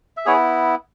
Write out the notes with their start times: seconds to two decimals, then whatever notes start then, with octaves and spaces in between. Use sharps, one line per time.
0.17 E5
0.26 B3 E4 G#4 C#5